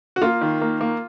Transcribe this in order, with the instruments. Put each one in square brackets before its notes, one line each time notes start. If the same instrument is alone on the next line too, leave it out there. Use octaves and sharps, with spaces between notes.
[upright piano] F#4
A#3 F4
D#3
A#3
A#3